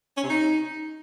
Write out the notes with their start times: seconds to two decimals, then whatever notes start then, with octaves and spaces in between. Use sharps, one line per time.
0.17 C#4
0.23 C3
0.30 D#4